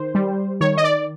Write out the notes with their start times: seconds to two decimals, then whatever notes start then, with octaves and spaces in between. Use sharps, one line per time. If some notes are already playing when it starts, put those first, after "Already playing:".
Already playing: D#3 C5
0.15 G3
0.61 D#3 C#5
0.77 D#5
0.84 D5